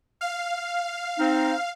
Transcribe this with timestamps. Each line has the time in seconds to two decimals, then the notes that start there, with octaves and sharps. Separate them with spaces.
0.21 F5
1.18 C4 D#4